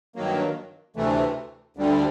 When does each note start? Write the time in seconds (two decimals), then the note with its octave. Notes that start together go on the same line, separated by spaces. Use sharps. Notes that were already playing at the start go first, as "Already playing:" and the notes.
0.16 G2 D#3 F#3 A#3
0.96 D2 C3 E3 A3
1.77 D2 D3 G3